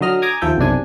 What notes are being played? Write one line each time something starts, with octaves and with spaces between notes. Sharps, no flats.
D3 F#3 D#5 F6
G#5 A#5 D6 D#6 G#6
D#2 F3 A4 E5 G5
B1 F#2 C3 D4 G#5